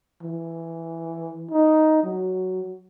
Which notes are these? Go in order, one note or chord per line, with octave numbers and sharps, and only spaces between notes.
E3
D#4
F#3